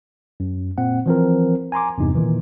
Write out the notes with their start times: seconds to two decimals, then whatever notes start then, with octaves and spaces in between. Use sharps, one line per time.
0.40 F#2
0.78 A#2 C4 F#5
1.06 E3 F3 C4 A#4
1.72 G#5 A#5 C6 D6
1.98 E2 G2 C3 D#4
2.15 A#2 D#3 E3